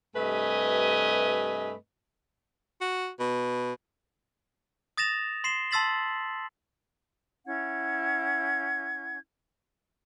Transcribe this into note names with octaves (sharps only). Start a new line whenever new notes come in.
G2 C3 A3 B4 D#5 G#5
F#4
B2
D#6 A6 A#6 E7 F7
C6 C7 E7 G7
A5 C6 E6 A6 B6 F#7
C#4 E4 F#5 G#6